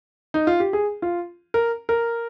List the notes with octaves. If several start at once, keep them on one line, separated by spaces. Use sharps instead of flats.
D#4
F4
G4
G#4
F4
A#4
A#4